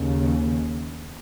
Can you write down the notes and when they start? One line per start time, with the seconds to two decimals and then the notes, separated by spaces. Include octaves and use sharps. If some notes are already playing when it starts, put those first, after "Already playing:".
Already playing: D#2 C#3